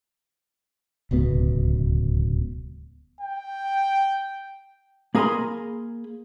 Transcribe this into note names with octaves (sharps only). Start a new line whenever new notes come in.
D1 C#2 B2 B3
G5
A#3 G#4 A#4 G#5 B5 C6